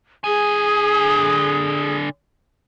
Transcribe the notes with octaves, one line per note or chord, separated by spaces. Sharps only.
D3 G#4 G#5 D#6